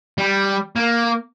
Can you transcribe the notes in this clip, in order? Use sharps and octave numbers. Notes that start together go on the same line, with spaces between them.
G3
A#3